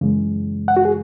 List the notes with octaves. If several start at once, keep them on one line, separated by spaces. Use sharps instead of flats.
F#2 C#3 E3 G#3
F#5
F#4
G#4